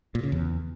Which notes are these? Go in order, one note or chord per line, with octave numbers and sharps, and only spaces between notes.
A#2
C#3
E2